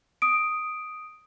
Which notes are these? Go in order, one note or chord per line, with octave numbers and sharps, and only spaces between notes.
D#6 D7